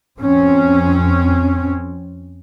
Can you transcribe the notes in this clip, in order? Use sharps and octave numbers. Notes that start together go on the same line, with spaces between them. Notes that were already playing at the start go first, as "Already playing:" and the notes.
F2 C4 C#4